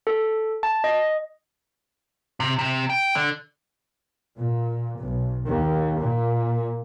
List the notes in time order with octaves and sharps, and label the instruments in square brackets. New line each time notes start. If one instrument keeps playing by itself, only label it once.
[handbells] A4
A5
D#5
[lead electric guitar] C3
C3
G5
D3
[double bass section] A#2
B1
D#2
A#2